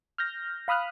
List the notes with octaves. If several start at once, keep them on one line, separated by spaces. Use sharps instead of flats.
F6 G6 A#6
F5 B5 D#6 F6 F#6